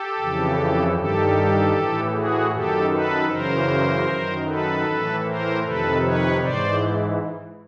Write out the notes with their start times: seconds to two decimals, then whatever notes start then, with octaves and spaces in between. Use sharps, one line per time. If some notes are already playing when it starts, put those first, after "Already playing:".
Already playing: G4 A4
0.18 F2 C#3 E3
0.95 G2 D#3 G4 A4
1.73 A2 E3
2.12 F#4 G#4
2.51 F#2 D#3 G4 A4
2.90 A4 B4
3.29 F#2 C#3 E3 A#4 C5
4.07 F#2 D#3
4.46 A4 B4
4.85 A2 E3
5.24 A#4 C5
5.63 F2 C3 D#3 A4 B4
6.02 B4 C#5
6.40 G#2 E3 C5 D5